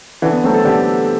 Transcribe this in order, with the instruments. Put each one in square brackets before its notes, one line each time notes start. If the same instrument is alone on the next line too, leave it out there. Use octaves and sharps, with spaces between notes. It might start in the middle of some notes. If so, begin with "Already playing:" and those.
[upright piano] D3 [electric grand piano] E3
[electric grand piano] B3
[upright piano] F#3 A3 [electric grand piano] C4
[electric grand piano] A4
[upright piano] D3 [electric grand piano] G4